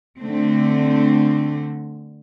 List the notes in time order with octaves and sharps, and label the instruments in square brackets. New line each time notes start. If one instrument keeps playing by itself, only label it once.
[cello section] D3 A3 C4